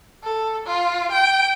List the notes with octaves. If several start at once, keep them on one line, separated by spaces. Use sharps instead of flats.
A4
F4
G5